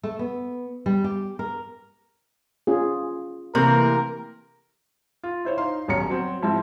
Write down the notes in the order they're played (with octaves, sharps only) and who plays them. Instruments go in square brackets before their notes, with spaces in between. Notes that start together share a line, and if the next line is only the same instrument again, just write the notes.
[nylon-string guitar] A3
B3
G3
G4
A#4
[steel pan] C#4 F4 G#4
[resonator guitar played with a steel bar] C3 [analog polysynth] E3 A3 A#3 [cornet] A#4
[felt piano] F4
E4 C5 C#5
D#4 F5 C6
D#1 B1 C#4 A#5 C#7
F#3 C4
G#2 F3 C4 E4